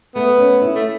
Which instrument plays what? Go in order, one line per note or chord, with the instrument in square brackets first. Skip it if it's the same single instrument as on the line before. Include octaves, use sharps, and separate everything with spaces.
[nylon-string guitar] A3 [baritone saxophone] B3
[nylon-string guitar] C#4
E4
[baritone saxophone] A3